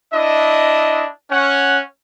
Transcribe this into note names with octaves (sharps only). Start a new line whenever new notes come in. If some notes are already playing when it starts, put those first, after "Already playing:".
D4 E4 D#5
C#4 F#5